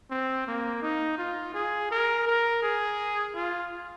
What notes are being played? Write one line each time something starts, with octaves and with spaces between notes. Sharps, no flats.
C4
A#3
D#4
F4
G#4
A#4
A#4
G#4
F4